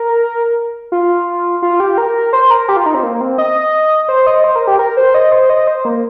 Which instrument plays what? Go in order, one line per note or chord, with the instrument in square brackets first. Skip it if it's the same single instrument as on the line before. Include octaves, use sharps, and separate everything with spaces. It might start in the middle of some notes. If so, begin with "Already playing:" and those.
Already playing: [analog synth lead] A#4
F4
F4
G4
A#4
C5
A#4
G4
F4
D#4
C4
A#3
C4
D#5
C5
D#5
C5
A#4
G4
A#4
C5
D#5
C5
D#5
C5
A#3